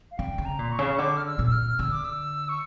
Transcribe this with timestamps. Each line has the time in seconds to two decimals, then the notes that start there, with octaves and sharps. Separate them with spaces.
0.11 F5
0.19 D3 G5
0.38 C#3
0.45 A#5
0.59 A#2
0.72 C#6
0.79 C#3
0.98 D3 D6
1.17 F6
1.26 E6
1.39 A#2
1.47 E6
1.52 F6
1.79 D3 E6
1.92 D6
2.05 E6
2.49 C#6